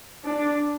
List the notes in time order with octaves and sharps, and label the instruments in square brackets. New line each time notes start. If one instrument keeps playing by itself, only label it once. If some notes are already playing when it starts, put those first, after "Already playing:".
[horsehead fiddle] D4